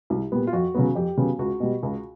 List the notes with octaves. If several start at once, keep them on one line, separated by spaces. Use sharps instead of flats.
C2
A#2 G3 B3
F4
F2 F#4
C#3 F#3 B3
F2 G4
C#3 F#3 B3
C#2 F#4
B2 G3
C#2